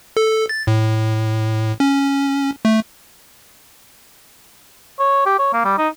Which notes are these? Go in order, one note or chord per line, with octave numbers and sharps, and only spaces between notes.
A4
A6
A2
C#4
A3
C#5
G4
C#5
A#3
G3
D#4